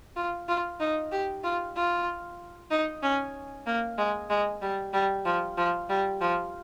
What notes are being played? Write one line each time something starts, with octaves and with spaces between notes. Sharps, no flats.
F4
F4
D#4
G4
F4
F4
D#4
C#4
A#3
G#3
G#3
G3
G3
F3
F3
G3
F3